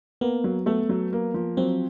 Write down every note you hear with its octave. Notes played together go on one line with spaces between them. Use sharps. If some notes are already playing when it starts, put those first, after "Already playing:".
A#3 B3
F#3
A3 B3
F#3
A#3
F3
F#3 C4